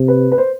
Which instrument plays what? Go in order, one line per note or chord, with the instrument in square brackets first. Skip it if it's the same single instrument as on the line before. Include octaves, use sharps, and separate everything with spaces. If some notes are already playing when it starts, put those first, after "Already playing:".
Already playing: [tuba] C3
[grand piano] B4
B4
C5